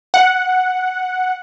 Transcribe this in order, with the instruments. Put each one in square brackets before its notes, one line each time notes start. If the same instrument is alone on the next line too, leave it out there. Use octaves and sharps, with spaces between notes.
[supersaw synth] F#5